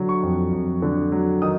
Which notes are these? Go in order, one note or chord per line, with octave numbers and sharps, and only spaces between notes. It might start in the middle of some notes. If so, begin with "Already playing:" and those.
Already playing: D3 F#3
C#6
F2
F2
D3
F#3
D#3 D#6